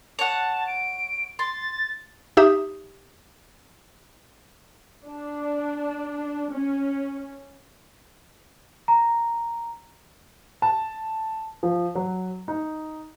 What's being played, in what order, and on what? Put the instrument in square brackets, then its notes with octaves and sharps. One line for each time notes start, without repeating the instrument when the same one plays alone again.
[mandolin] C#5 F#5 [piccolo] A5
[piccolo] D7
[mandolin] C6 [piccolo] A6
[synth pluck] D#4 G4 E5 D#6
[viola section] D4
C#4
[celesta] A#5
[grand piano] A5
F3
F#3
D#4